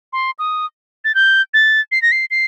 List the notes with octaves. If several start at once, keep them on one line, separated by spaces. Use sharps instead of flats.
C6
D#6
A6
G6
A6
C7
A#6
C7
C7